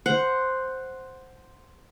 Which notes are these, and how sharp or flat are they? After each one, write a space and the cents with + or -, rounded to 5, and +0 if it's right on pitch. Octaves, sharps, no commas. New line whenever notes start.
C5 +0 F#5 +0